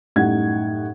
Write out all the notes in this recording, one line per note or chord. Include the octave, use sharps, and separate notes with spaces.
F#2 A2 G3 D#4 F#5 G#6